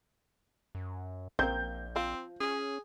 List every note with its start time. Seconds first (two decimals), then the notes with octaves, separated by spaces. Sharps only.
0.75 F#2
1.39 A#1 A#3 C4 G6
1.96 F3 C4 F4
2.40 C#4 G#4